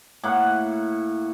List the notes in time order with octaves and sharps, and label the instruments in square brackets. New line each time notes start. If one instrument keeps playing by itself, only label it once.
[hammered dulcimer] A2 A#3 F#5